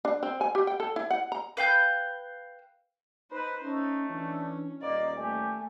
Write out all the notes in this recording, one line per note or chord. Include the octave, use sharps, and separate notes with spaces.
D4
C4
G#5
G4
G5
A4
E4
F#5
A#5
B4 F5 G5 G6
D#4 B4 C5
A3 C#4 D#4
E3 C#4 D4
D#1 A#3 D5 D#5
A3 G4 G#5